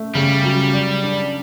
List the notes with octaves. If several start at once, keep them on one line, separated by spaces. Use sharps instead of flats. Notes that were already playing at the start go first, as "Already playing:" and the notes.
Already playing: A3
C#3 G3
F#3
D5
D4